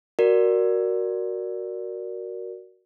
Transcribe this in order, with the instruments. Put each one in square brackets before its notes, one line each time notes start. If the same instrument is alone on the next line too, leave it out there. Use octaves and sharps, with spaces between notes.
[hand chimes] F#4 A#4 D5